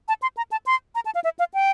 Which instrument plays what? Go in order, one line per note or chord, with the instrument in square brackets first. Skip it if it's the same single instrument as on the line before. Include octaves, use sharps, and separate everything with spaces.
[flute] A5
C6
A#5
A5
C6
A#5
A5
F5
E5
F5
G5